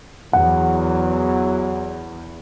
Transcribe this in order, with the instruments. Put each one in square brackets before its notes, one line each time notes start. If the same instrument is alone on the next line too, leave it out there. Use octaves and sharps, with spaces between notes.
[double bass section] E2 [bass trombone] F#3 [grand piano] F#5